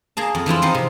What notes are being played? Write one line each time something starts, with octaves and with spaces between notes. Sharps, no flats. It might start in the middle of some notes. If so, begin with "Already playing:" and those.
A#3 G#4 A5
F2
E3 F3 E4 F4
F3 C4 D#4
C3